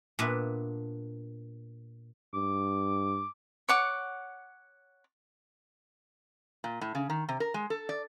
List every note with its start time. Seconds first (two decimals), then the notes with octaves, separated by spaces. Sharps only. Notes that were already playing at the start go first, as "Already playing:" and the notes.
0.19 A#2 B3 D4 B4 E5
2.34 G2 D6
3.69 C#5 F#5 D6
6.64 A#2
6.81 A2
6.95 C#3
7.10 D#3
7.29 C3
7.40 A#4
7.54 G#3
7.70 A4
7.89 D5